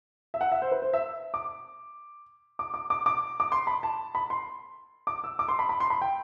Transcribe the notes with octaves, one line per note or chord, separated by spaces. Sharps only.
E5
F#5
E5
C5
B4
C5
E5
D6
D6
D6
D6
D6
D6
C6
B5
A5
B5
C6
D6
E6
D6
C6
B5
B5
C6
B5
G5